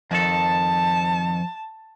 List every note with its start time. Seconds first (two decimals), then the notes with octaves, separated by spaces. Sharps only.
0.11 F2 D#3 F3 A4 A5